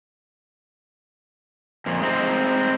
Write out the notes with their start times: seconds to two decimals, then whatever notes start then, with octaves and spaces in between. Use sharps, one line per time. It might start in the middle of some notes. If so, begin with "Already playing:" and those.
1.86 F2 A#2
2.00 G#3 A3 C4 D#4